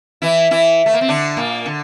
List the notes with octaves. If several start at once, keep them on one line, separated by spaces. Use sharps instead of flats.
E3 E4
E3 E4
A3
A#3
C4
D3 D4
A#2 A#3
D3